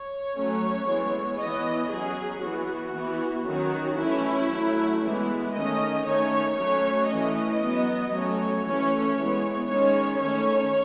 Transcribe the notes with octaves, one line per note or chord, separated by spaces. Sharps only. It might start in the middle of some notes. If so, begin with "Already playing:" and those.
Already playing: C#5
F#3 A3 C#4
E3 G#3 B3
E3 B3 D#5
F#3 C#4 G#4
E3 B3 F#4
E3 B3
D#3 F#3 C#4 F#4
E3 A3 C#4 E4
F#3 A3 C#4
E3 G#3 B3 E4
D#3 A3 C#4 D#5
D#3 A3 C#4 C#5
F#3 A3 C#4 C#5
E3 A3 C#4 D#5
F#3 B3
F#3 A3 C#4 C#5
E3 A3 C#4
E3 G#3 B3
D#3 G#3 C#4 C#5
D#3 A3 C#4 C#5